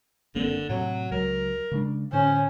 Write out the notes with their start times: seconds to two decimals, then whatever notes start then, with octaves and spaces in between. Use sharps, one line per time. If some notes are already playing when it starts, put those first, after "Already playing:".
0.35 F#1 D3 A#3 C4
0.69 A2 C3 F#3
1.11 C#2 F#3 A#4
1.72 C#3 G#3 D4
2.13 A2 D3 C#4 C5